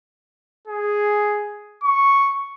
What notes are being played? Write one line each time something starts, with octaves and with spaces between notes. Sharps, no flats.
G#4
C#6